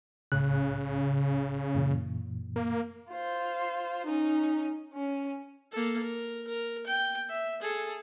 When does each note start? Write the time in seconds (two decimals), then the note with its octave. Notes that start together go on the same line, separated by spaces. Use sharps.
0.32 C2 A2 C#3 F#6
1.75 F#2 A#2 E3
2.56 A#3
3.11 F4 C5
4.06 C#4 D#4
4.94 C#4
5.72 A#3 A4
6.02 A#4
6.47 A#4
6.86 G5
7.30 E5
7.61 G#4 A4